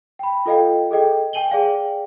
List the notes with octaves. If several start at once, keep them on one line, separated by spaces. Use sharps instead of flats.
G5 B5
F4 A4 D#5 F5 G5
G#4 A4 D#5 G5
G5 G#5 D#7 F#7 G7
G#4 D5 F5 G5